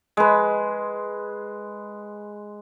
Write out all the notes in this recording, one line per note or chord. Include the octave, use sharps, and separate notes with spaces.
G#3 B4